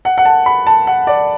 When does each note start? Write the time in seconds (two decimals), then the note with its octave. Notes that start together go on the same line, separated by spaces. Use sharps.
0.05 F#5
0.18 F#5
0.25 A5
0.46 B5
0.67 A5
0.87 F#5
1.07 D5